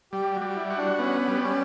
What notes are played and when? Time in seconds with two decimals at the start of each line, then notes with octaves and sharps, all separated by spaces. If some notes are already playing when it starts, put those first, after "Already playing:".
0.13 G3 G4
0.35 F#4
0.41 G3
0.55 E4
0.70 F#4
0.77 D4
0.98 B3 C#4
1.28 G3
1.43 C#4